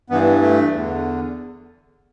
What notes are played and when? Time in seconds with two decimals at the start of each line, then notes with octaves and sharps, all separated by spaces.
0.10 G2 E3 B3
0.41 A3
0.71 E2 D3